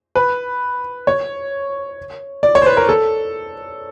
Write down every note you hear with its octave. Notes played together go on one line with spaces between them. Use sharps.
B4
C#5
D5
C#5
C5
B4
A#4
A4